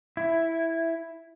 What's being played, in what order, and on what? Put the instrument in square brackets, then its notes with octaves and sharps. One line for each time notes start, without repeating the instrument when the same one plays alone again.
[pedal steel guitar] E4